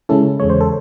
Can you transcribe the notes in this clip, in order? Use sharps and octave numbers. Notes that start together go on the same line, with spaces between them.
C#3 G#3 C#4 E4 A4
E2 C#3 G#3 C#5
C5
A4